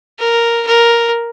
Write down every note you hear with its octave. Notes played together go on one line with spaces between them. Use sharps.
A#4
A#4